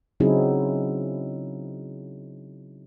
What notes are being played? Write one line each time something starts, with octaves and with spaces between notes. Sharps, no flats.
C#3 F#3 C4 D#4 E4 G#4